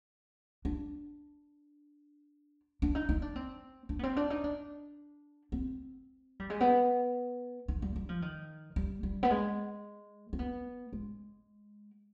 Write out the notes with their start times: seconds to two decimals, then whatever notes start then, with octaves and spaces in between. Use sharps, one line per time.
0.65 D4
2.82 D4
2.95 D#4
3.09 D#4
3.22 D4
3.36 C4
3.89 D4
3.99 B3
4.03 C4
4.16 D4
4.30 D#4
4.44 D4
5.52 C4
6.40 G3
6.50 G#3
6.60 B3
7.68 D#3
7.82 G3
7.96 G3
8.09 F3
8.22 D#3
8.76 G3
9.03 G3
9.23 B3
9.30 G#3
10.33 C4
10.39 B3
10.93 G#3